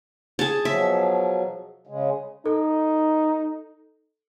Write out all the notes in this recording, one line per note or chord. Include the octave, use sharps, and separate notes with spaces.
G#4 A5
B2 F3 F#3 E5
C#3 G#3
D#4 A4